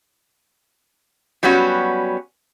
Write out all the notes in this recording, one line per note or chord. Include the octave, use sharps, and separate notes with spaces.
F#3 G3 B3 C#4 F#4